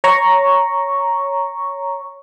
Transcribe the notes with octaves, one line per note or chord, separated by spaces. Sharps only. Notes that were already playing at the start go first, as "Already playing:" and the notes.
C#5 A#5 C#6